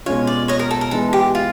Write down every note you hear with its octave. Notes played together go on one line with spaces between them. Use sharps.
B2 G#3 C#4 F4 C#5
D5
C#5 D#5
A#4
A4
A#4
E3 G#3 B3 A4
G4
F4